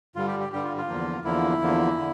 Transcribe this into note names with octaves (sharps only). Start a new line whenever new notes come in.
G2 D3 G3 F4
G4
G4
G2 D3 G3 G4
F4
F4
E2 D3 F3 A#3
E2 D3 F3 A#3 E4
E2 D3 F3 A#3
D3